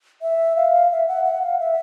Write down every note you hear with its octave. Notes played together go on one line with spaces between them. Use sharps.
E5
F5
E5
F#5
F#5
F5
E5